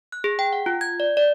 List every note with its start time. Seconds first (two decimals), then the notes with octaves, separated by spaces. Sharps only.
0.12 F#6
0.24 G#4
0.39 G5
0.53 F#5
0.66 F4
0.81 G#6
1.00 D5
1.17 D5